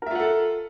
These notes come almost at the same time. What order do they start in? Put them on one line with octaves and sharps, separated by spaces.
A#4 E5 F4 F#5 A4